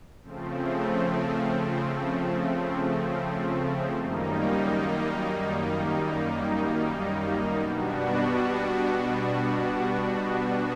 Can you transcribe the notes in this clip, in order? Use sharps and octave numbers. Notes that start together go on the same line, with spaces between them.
C#3 F3 A3 C4
F#2 D#3 G3 A#3 D#4
B2 G3 B3 D4 F#4